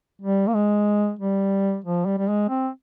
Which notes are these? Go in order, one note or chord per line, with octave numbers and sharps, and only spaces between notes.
G3
A#3
G#3
G3
F3
G3
G3
G#3
C4